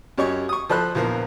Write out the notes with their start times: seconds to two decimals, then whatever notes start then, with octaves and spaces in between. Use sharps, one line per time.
0.18 F#2 G4 C#5 D#5 C#6
0.49 C#6 D#6
0.69 F3 A4 C5 B5 F#6
0.95 A#1 E2 F3 A#4